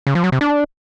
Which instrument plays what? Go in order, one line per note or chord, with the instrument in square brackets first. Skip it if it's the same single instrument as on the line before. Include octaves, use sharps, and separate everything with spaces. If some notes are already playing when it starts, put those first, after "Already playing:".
[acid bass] C#3
F3
F#3
C3
D4